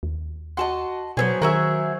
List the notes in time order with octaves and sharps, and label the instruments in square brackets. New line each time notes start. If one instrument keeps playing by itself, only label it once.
[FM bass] D#2
[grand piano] F#4 F#5 [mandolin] D#5 A5 C6
[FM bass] B2 [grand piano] F#3 C5 C#5 [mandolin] B3 C4 G#4
[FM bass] D#3 [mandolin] F#4 G#4 E5 [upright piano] A#4